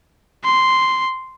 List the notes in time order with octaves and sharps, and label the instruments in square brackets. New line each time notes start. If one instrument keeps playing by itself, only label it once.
[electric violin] C6